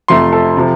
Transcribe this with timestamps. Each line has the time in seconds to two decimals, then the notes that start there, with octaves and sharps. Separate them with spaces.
0.08 F2 C3 F3 A3 C6
0.32 A4
0.57 C3 F3